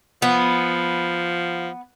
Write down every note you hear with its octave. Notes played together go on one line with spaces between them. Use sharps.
F3 B3